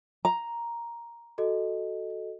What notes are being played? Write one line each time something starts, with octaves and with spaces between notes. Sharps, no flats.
A#5
F#4 A4 D#5